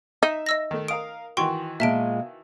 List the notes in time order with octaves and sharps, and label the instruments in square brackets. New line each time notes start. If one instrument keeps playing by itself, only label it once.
[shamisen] D#4 [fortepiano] E5
[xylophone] D#5 E6 A#6
[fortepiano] D#3 A3
[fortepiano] A#4 F5 D#6 [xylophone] D7
[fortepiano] D#3 E3 F#4 [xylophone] G5 C6 C#6
[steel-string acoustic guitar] A#2 G#3 [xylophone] E5 A5 D7